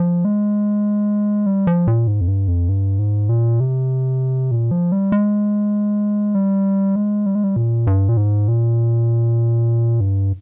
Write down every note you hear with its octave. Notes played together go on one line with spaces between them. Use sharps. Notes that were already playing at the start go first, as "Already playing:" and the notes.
Already playing: F3
G#3
G3
F3
A#2
G#2
F2
G2
F2
G2
G#2
A#2
C3
A#2
F3
G3
G#3
G3
G#3
G3
G#3
G3
A#2
G2
A#2
G#2
A#2
G2